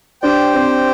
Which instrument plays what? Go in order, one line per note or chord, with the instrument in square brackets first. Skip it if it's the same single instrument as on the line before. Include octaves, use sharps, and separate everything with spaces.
[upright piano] D4 [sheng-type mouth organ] G4 C5 G5
[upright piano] C4